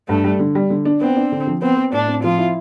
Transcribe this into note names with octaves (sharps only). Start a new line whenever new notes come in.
G2 A3
G3
D3
G3
D3
D4
B3 C4
D4
D3
F3
B3 C4
B3
A2 D4
C4
F3 F4
E4